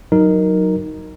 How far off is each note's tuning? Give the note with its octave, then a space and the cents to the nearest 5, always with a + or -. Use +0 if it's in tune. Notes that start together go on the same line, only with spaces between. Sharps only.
F#3 +0 D#4 +0 A#4 +0